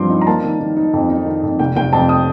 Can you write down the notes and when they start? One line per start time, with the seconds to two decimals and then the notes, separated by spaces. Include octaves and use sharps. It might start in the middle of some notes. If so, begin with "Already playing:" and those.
Already playing: G2 F3 C4 C6 D6
0.10 D#4
0.21 A#5
0.27 A#3 A5
0.43 D#3
0.60 D#3
0.76 D#4
0.93 F2
1.10 D#4
1.26 D#3
1.43 F2
1.59 F1 G5
1.76 F1 G5
1.93 F2 A5
2.09 D#6